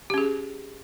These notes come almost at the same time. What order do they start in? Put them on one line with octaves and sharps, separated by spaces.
G4 C#4 G#4